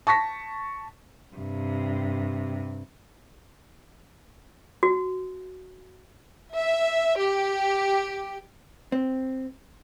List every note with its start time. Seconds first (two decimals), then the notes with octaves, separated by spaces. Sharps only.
0.07 A5 C#6 A#6 B6
1.36 G2 C3
4.83 F#4
6.55 E5
7.18 G4
8.92 C4